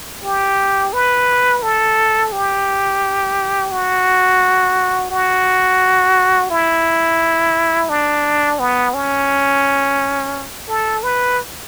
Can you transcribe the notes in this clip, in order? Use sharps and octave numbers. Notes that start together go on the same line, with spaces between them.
G4
B4
A4
G4
F#4
F#4
E4
D4
B3
C#4
A4
B4